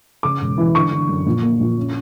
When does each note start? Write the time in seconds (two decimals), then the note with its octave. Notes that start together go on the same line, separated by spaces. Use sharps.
0.23 C#3 D6
0.41 E1
0.58 E3
0.74 D3 C#6
0.92 D3
1.09 F#2
1.26 A#1
1.42 A#3
1.60 A#1
1.78 C#4